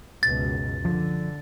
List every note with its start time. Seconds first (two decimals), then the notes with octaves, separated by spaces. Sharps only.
0.23 C#2 F#2 B2 A6
0.85 D3 F3